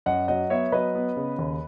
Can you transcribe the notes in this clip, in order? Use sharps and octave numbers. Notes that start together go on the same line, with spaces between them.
F#2 D#5 F#5
F#3 D#5 F#5
B3 C#5 E5
F#3 B4 D#5
B3
C#3
D#2